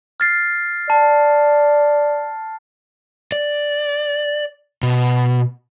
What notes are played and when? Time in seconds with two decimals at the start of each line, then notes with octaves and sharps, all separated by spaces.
0.20 F6 A6 C7
0.90 D5 A5
3.32 D5
4.83 B2